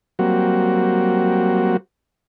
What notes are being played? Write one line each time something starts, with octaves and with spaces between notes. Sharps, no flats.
F#3 G3 A#3 C4 F#4